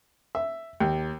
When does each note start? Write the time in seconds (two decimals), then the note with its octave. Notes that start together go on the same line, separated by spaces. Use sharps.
0.35 E5
0.80 D#2